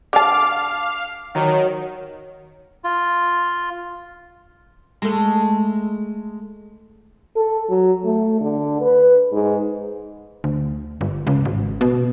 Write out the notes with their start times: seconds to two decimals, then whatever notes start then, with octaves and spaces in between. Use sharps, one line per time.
0.13 D3 F5 A5 D6 F6
1.35 D#3 F#3
2.84 F4
5.02 G#3 A3
7.36 A4
7.69 F#3
8.05 A3
8.41 D3
8.81 B4
9.32 G#2
10.44 D2
11.01 G1
11.27 C#2
11.45 G#1
11.81 B2